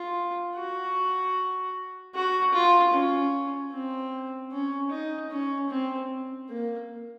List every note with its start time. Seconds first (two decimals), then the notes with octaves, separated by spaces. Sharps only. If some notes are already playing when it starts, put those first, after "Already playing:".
Already playing: F4
0.56 F#4
2.15 F#4
2.53 F4
2.93 C#4
3.72 C4
4.52 C#4
4.91 D#4
5.30 C#4
5.70 C4
6.50 A#3